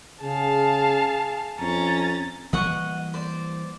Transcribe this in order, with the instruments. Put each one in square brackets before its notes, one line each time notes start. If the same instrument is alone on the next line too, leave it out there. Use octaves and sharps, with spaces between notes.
[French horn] C#3 [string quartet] G#4 [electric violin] F5 A5
[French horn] F2 [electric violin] C#4 A6 [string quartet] A#5
[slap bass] E3 G3 A#3 [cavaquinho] D#5 F#5 C#6
[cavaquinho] C5 D5